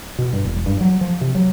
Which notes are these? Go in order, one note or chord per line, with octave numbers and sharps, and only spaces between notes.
B2
G2
E1
G2
F#3
F3
C3
F#3